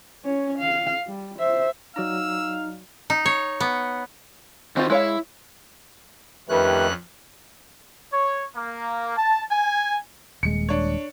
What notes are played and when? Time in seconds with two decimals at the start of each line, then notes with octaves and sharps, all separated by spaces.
0.24 C#4 C#5
0.59 F5
1.07 G3
1.38 C5 E5
1.96 F#3 D#4 D5 F5 A#5 E6
3.10 D#4
3.25 C#5
3.60 B3
4.77 D#3 C4 F4 F#4 C5
4.90 G#3 E4 C#5 F5
6.49 F2 D#3 A3 C#4 G4 B4 F#6
8.12 C#5
8.55 A#3
9.16 A5
9.51 G#5
10.43 D#1 G#3 C#7
10.69 D4 C#5